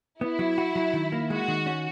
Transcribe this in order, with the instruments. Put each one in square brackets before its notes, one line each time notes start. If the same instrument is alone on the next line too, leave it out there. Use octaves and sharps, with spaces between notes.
[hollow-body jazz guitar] B3 [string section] E4
[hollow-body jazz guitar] F#3
F#4
F#3
D#3
A#3
[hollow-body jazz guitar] G#3 [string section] F#4
[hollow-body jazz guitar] D#3
C#4